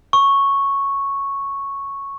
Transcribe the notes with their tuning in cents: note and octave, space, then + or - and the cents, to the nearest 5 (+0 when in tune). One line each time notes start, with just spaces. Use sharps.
C#6 -5